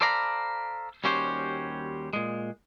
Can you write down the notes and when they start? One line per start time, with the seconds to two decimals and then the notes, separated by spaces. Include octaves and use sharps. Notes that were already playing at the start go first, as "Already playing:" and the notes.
0.01 A4 C5 D5 F5 A#5 B5
1.04 D#2 G3 C#4 F#4 G4 C5
2.13 A#2 G#3